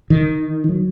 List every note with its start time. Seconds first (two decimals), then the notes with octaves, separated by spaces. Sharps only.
0.10 D#3
0.69 F#3